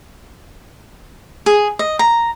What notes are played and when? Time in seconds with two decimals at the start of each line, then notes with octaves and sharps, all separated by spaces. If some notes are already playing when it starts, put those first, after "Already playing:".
1.46 G#4
1.79 D#5
1.99 A#5